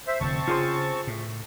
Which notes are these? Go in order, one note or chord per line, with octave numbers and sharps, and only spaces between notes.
C5 E5
F1 D3 F3 C4 A5 C#6
C#3 F4 G#4 C5
A2